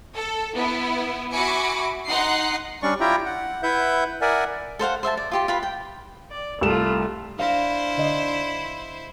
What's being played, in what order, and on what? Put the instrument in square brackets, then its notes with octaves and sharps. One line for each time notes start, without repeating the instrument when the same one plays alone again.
[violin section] A4
B3 E4
F#4 E5 G#5 B5 D6 C#7
D#4 F#5 C6 F#6 C7
[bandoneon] G3 C#4 D4 D5 C#6
E4 F4 G4 E5 G5 A#5
F#5
E4 B4 E5 F#5 G6
A#4 D5 E5 F#5 G#5
[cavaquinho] A4 C5 F5 F#5
C5 E5 F5 A5
D5
F4 G4 C6
F4 B4 B5
G5
[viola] D5
[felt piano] C2 E7 [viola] A3 F4
[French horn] D4 [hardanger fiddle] E4 C5 [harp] F5 A#6
[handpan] D3 D#5